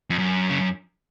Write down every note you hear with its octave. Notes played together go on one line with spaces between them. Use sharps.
F2
F#2
C#3